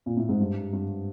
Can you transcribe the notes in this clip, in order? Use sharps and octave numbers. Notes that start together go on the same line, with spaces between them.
A#2
A2
G#2
G2
G2